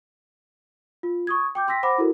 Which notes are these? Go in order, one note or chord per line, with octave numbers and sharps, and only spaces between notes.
F4
C#6 D#6 G#6
G5 D6 G6
G5 C6 E6 A#6 B6
C5 F#5 B5 D6 A#6
E4 F#4 A4 A#4